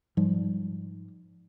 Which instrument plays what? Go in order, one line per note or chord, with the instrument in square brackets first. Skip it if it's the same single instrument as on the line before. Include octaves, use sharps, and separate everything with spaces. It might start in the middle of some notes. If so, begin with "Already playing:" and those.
[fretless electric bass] G#2 F3 G3